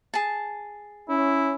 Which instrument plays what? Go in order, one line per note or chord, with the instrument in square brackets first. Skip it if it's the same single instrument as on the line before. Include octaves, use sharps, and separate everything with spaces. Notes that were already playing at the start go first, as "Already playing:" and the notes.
[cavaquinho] G#4 A5
[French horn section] C#4 [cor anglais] E4